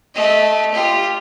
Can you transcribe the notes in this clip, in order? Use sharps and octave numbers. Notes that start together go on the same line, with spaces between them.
A3 D#5
F4 G4